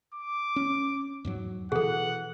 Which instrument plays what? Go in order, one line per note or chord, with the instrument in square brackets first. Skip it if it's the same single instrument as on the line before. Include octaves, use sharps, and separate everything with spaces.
[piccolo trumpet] D6
[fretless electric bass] C#4
E2 G#2 F#3
[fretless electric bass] B2 E3 [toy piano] G#4 A4 [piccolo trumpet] F#5